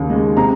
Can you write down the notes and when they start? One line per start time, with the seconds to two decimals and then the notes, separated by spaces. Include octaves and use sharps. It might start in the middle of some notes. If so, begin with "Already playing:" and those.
Already playing: D#2 C#3
0.10 G#3
0.37 C3 A#5